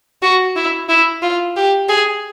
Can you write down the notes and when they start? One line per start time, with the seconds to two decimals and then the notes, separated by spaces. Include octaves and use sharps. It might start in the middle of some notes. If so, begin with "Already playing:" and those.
0.22 F#4
0.56 E4
0.89 E4
1.22 F4
1.56 G4
1.89 G#4